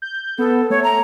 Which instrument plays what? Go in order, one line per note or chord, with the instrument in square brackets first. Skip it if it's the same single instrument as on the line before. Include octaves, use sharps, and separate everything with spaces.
[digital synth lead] G6
[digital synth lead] B3 [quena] A4
[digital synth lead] A3 [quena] C#5
[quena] A#5